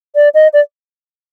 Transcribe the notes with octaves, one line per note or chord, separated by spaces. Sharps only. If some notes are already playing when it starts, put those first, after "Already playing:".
D5
D#5
D5